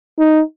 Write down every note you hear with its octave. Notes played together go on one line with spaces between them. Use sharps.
D#4